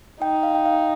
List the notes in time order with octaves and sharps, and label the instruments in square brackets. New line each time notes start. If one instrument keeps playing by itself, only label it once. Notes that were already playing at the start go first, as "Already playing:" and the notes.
[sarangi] D#4 [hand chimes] G5
[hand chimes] F5
G5
F5